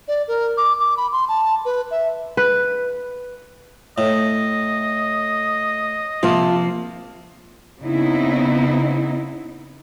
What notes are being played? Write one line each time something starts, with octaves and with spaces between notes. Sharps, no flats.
D5
A#4
D6
D6
B5
C6
A5
B4
E5
B4
A2 D#5
C3 F3 A#3 F4 A5
C#3 B3 C4 D#4 E4